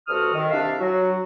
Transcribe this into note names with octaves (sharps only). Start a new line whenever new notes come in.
G2 C4 F#4 A4 D#6 F6
D#3
C2 D4 E5 F5
F#3 F#4